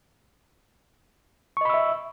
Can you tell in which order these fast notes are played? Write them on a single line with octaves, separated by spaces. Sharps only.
C#6 D#5 B5 E6 E5